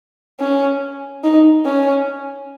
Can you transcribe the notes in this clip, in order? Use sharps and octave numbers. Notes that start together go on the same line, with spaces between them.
C#4
D#4
C#4